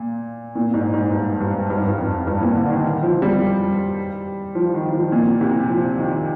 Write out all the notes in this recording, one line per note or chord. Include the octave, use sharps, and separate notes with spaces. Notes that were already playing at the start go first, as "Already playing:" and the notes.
Already playing: A#2
A#2
G#2
G#2
G2
G2
G2
G#2
G2
F2
G2
A#2
D3
D#3
F3
G3
F3
D#3
F3
A#2
C3
F3
D#3